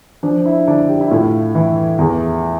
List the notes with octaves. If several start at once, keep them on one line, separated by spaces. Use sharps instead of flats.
F3 D4
E4
D3 D4
G4
E4
A2 F4
E3
E2